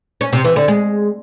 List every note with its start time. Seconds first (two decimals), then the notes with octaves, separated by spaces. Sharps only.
0.21 C#4
0.33 C3
0.44 E3
0.56 D3
0.68 G#3